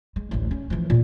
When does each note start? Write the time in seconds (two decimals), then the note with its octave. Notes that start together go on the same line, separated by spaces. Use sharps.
0.16 G#3
0.31 A1 D2
0.51 C#4
0.70 E3 F3
0.90 A#2 E3